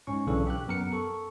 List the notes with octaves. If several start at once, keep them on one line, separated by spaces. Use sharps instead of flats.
G#2 C#4 C#6
B1 C#3 E3 D4 A4 C#6
G4 F#6
F#2 B3 A#4 C#7
A4 C#6